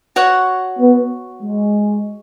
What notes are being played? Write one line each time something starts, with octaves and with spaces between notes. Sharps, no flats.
F#4 C#5 F#5
B3
G#3